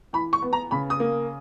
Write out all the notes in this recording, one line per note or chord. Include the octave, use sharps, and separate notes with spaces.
E3 B5
C#6
B3
A#5
C#3 B5
D#6
A#3